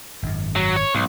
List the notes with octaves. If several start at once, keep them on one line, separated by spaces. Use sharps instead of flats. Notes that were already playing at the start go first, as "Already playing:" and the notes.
G#1 F#2
F#3
C#5
B1 G#2